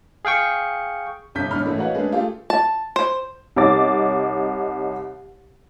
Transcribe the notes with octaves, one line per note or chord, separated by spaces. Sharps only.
G#4 F5 G5 C#6
G1 C2 C3 G6 B6
A1 E2 G#2 D4 B5 F6
A2 E3 G#3 A3 E4
F#4 B4 C#5 D#5 F5 F#5
G#3 A3 C#4 D4 G#4 B4
A3 F4 G4 G#4
A5
C5
C2 D#4 C#5 D6 A6